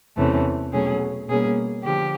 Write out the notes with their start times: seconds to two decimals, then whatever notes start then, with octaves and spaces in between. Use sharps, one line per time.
0.17 E2 C3 E3 A3 C#4
0.72 B2 F#3 A3 C#4 G#4
1.28 B2 G3 A#3 C#4 G#4
1.84 D3 F3 G4